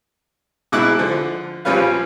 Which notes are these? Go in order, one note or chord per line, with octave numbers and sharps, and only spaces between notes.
G#2 B2 E4 D6 F#6
D3 F3
A#1 F3 G3 C#4 B4 F5